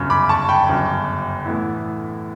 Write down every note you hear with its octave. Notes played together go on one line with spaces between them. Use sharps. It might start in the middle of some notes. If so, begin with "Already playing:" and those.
Already playing: G1 F#2 C#3
B5 D6
A5 C#6
G5 B5
G1 F#2 C#3
A2 E3 B3 E4